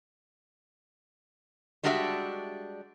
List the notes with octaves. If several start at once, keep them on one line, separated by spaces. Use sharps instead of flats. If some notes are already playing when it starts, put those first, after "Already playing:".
G3 G#3 D4 F#4 G#4 E5